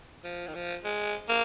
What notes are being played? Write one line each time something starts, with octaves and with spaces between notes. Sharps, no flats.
F3
D#3
F3
G#3
A#3